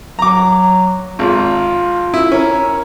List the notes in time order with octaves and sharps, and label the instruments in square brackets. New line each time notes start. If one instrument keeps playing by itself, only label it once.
[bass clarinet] F#3 [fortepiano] A#5 D6
[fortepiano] G#1 [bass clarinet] F4
[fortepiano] E4
[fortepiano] C#4 [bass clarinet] A#4